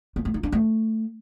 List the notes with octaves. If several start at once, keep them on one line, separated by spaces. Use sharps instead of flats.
A#3
A3
D#4
D4
A3